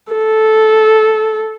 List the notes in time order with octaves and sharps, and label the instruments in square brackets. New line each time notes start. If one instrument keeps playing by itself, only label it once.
[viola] A4